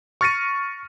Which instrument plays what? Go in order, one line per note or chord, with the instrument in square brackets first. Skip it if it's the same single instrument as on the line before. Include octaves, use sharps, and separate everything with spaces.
[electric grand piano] C#6 F6 A6 A#6 C#7 D#7